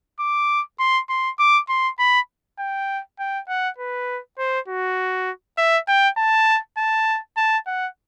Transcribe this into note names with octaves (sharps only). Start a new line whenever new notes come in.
D6
C6
C6
D6
C6
B5
G5
G5
F#5
B4
C5
F#4
E5
G5
A5
A5
A5
F#5